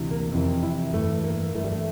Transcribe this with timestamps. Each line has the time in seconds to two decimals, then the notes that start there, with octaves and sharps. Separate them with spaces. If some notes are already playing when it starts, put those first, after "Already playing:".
Already playing: D2 C3 E3
0.11 A#3
0.32 F2 C3 E3 C4
0.63 E4
0.93 G2 E3 A3
1.24 A#3
1.55 G2 E3 A3
1.64 G3
1.72 A3